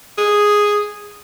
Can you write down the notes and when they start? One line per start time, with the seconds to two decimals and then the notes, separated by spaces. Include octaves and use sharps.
0.18 G#4